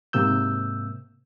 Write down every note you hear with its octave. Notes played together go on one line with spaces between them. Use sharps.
G#2 C3 A#3 E6 G6